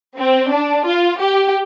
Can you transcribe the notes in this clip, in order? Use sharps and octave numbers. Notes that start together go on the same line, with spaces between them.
C4
D4
F4
G4